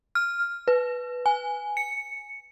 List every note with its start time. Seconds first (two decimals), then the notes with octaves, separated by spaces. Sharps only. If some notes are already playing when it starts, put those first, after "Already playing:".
0.15 F6
0.68 B4
1.26 G#5
1.77 C#7